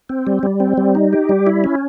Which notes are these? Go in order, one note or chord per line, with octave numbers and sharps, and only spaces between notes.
C4
G3
G3
C4
G3
D#4
G4
G3
E4
C#4